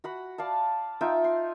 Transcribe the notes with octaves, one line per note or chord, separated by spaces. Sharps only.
F#4 F#5 B5
D5 F5 A5
D#4 F4 E5 G5
C6